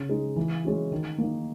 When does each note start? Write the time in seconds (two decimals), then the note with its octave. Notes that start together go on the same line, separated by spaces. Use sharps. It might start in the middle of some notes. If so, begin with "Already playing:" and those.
Already playing: C#3
0.09 G#3 D#4
0.36 E3
0.65 G#3 C#4 F#4
0.92 D#3
1.18 A#3 D#4